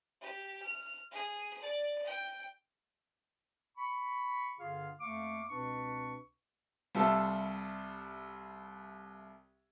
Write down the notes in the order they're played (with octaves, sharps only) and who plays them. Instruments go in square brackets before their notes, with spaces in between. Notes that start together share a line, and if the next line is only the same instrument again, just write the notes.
[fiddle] G4
F6
G#4
D5
G5
[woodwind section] B5 C#6
G2 D3 F4 G#4 F5
F2 A3 A#3 F5 C#6 D6
C#2 B2 C4 D4 B4 C#6
[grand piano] C2 G3 F4 A4 E5